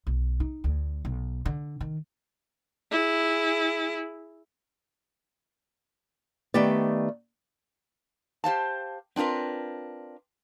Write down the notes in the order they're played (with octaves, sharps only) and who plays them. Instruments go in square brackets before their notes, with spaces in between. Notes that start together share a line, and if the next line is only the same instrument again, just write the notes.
[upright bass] B1
D#4
D2
B1
D3
D#3
[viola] E4 G#4
[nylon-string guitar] D#3 A3 B3 G4 D5
[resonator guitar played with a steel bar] G4 C5 F5 A5
C4 D4 F4 A#4 B4